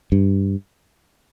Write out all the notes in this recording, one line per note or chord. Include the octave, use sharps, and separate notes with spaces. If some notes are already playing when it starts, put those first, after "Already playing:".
G2